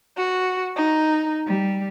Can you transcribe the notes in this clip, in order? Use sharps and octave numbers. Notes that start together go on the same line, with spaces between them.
F#4
D#4
G3